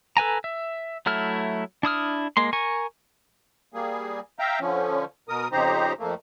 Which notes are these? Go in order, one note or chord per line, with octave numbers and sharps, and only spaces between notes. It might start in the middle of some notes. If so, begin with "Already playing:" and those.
A4 B4 G#5 A#5
E5
F#3 A3 E4 F6
D4 E4 D#6 F6
G#3 A#3 C6
A#4 G#5 C#6
G3 A#3 G#4
E5 F5 G5 A#5
D3 F3 C#4
B2 A#4 D#6
F2 C#3 D#4 G4 C5 A#5
F2 A3 A#3